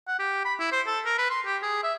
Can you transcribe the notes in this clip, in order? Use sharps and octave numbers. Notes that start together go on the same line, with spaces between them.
F#5
G4
B5
E4
C5
A4
A#4
B4
C6
G4
G#4
E5